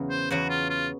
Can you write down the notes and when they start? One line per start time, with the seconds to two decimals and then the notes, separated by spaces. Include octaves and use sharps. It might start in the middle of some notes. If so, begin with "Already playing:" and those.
Already playing: E2 C#3 F#3
0.10 C5
0.30 E2 C#3 F#3 F#4
0.50 F4
0.70 F4